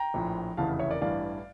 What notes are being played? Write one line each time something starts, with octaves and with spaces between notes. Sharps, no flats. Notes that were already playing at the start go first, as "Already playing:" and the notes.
Already playing: G5 A#5
A#1 A2 F3
F1 E2 C#3 E3 F5 A5
C#5 E5
A#4 D5
A1 G2 E3 D5 F5